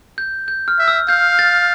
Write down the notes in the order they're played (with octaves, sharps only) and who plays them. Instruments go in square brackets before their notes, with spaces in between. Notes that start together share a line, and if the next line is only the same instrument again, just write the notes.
[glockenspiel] G6
G6
F6
[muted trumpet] E5
[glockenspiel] E6
[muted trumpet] F5 [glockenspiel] G6
[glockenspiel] A6